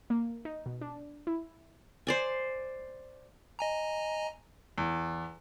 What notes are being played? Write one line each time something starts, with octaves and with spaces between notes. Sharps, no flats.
A#3
D#4
B2
D4
E4
C5 D5 G#5
D#5 G#5 A#5
E2